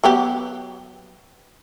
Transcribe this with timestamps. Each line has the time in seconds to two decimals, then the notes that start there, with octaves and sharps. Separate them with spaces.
0.04 F#3 B3 G4